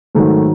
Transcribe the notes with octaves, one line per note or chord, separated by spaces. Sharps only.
G#2 D#3 F#3 A3